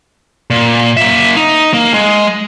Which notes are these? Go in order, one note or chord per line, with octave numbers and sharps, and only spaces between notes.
A#2
A#3 E5
D#4
A#3
G#3